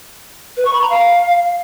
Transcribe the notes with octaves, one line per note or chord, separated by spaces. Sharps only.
B4
C#6
B5
A#5
F5